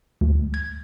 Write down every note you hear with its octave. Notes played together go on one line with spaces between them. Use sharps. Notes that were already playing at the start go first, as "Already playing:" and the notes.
D2
G#6